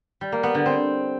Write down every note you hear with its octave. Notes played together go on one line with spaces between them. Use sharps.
G3
A#3
B3
D3
C4